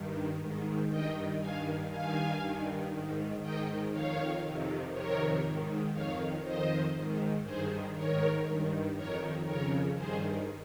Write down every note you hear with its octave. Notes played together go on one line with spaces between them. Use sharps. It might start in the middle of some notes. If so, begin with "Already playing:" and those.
Already playing: G2 D#3
G#2 D#3
G2 D#3 D#5 G5
G2 D#3 F5 G#5
G2 D#3 F5 G#5
G2 D#3
G#2 D#3
G#2 D#3 D#5 G5
F2 D#3 C#5 F5
F2 C3 D#3
F2 C3 D#3 A#4 C#5
G#2 D#3
F2 D#3 C#5 F5
F2 D#3 C5 D#5
G#2 D#3
G2 D#3 G#4 C5
G#2 D#3 A#4 C#5
G2 D#3
F2 D#3 A#4 C#5
F2 C#3 A#4 C#5
G2 D#3 G#4 C5